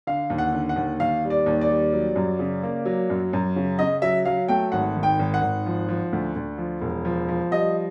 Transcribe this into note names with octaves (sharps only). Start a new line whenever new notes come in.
D3 F5
D#2
F#5
D3
F#5
D#2
D#2 F5
G3
D5
D#2
D5
G3
F#3
F#2
C#3
A#3
F#3
F#2
F#2
C#3
C#3 D#5
F#3 E5
F#3 F5
A3 G5
G#1 F#5
D#3
G5
G#1
F#5
G#1
F3
F3
D2
D2
F3
E1
F3
F3
G3 D#5